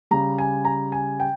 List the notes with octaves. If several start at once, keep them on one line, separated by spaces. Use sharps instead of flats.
C#3 G3 A#5
G#5
A#5
G#5
G5